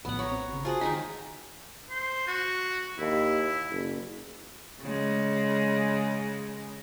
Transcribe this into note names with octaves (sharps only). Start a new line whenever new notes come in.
A#1 A2 B3 F#5
C#5 A#5 B5
C4
G#1 C#3
F4 F#4 G#4 C5 F#5 A5
D#3 G#3 D#4 B6
C5
F#4
D#2 E4
F#1
C#3 G#3